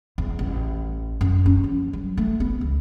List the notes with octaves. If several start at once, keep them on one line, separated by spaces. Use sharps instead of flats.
E2
A1
F#2
C#4
F3
F#3
A3
B3
C#2